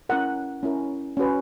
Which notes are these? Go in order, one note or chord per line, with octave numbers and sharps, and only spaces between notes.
C#4 E4 A#4 F#5
C#4 E4 A#4
C#4 F#4 B4